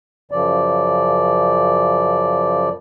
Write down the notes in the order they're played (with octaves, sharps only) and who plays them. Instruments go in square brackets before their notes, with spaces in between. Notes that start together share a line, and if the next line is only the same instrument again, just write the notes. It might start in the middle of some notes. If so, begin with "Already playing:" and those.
[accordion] F#2 C#3 F3 D5